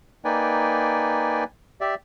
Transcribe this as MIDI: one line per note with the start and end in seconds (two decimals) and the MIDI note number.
0.25 1.44 58
0.25 1.44 63
0.25 1.44 71
0.25 1.44 74
0.25 1.44 79
0.25 1.44 80
1.81 1.95 67
1.81 1.95 74
1.81 1.95 76